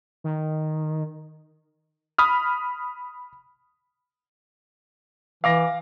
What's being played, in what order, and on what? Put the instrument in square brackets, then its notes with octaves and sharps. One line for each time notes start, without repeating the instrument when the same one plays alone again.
[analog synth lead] D#3
[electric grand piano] B5 D#6 F6
[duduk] E3 [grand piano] F5 D6 A#6